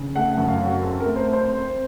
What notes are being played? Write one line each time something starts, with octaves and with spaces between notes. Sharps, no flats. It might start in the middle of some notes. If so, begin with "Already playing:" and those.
Already playing: C#3
A3 F#5
F#5
F#2
F5
C#4
F#4
C4 A4
A3 A#4
C5
C4
C5
C4